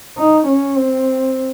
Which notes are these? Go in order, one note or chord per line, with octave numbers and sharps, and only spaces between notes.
D#4
C#4
C4